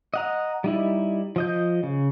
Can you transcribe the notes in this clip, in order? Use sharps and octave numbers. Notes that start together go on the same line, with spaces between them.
D#5 F#5 A#5
G3 D#4 E4
F3 D#5 G6
C#3